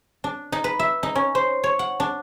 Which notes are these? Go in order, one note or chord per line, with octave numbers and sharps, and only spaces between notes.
D4
D#4
B4
E5
D#4
C#4
C5
C#5
F#5
D4